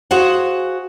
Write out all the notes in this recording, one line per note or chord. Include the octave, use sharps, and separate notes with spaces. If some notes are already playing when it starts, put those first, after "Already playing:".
F#4 G#4 C5 F5 F#5